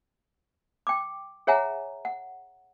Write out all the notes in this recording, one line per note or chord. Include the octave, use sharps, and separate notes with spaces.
G5 D6
G#4 C#5 E5 F#5 G#5 A#5
F#5